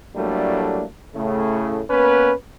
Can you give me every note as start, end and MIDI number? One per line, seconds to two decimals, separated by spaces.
0.15 0.84 45
0.15 0.84 54
0.15 0.84 55
0.15 0.84 57
0.15 0.84 58
0.15 0.84 62
1.15 1.81 45
1.15 1.81 49
1.15 1.81 57
1.90 2.31 58
1.90 2.31 59
1.90 2.31 61
1.90 2.31 71